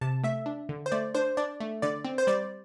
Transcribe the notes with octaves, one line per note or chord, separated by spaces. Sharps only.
C3 A5
A3 E5
D4
D3
C5
A3 D5
D4 C5
D4 D5
A3
D3 D5
C4
C5
G3 D5